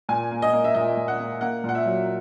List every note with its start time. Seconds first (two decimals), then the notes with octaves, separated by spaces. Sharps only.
0.09 A#2 G#5
0.31 A#3
0.42 D#5
0.53 A#3
0.64 E5
0.74 A#2 D#5
0.97 A#2
1.08 F#5
1.20 A#3
1.41 A#3 F#5
1.64 A#2
1.69 F#5
1.75 E5
1.86 F#3